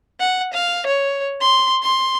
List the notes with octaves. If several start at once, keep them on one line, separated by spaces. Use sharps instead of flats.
F#5
F5
C#5
C6
C6